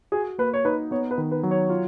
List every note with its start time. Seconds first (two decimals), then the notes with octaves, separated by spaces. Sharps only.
0.12 F#4 G#4
0.38 A#3 B4
0.53 C#5
0.65 D#4 B4
0.91 B3 C#5
1.11 B4
1.18 D#3
1.31 B4
1.43 F#3
1.51 C#5
1.70 F4